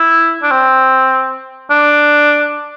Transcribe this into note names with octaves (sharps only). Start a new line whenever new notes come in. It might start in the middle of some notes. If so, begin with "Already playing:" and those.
Already playing: E4
D4
C4
D4